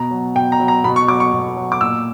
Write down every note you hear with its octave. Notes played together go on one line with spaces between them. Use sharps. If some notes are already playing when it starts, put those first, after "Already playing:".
Already playing: B2 A#5
F#3
B2 G5
A#5
F#3
A#5
B2 B5
C#6
F#3 D6
C#6
B2
F#3
D6
A#2 E6